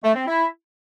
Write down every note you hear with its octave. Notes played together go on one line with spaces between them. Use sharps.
A3
C4
E4